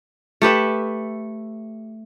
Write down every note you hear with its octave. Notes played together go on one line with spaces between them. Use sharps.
A3 G4 B4 E5